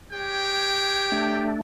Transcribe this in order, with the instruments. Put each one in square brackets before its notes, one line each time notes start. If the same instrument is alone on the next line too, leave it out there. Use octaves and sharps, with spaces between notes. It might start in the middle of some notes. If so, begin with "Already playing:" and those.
[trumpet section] G#3 C#5 G5 [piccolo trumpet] G4
[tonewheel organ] A3 D4